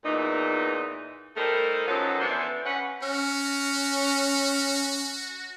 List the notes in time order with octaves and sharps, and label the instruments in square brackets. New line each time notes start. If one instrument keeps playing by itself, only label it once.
[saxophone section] E2 A#2 E3 D#4
G3 A3 D#4 A4 A#4 C5
F#2 F3 F#3 D#4 A4 B4
E3 B3 D4 E4 A4 C5
C#4 B4 F#5
[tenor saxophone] C#4 [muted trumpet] F#4